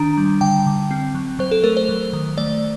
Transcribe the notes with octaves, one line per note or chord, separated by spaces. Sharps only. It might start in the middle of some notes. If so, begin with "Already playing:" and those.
Already playing: D#3 D4 A#5
G3
D3 G5
D3
C4
F#3
F#3 C5
A4
A3 A#4
C5
F#3
D#3
A3 D5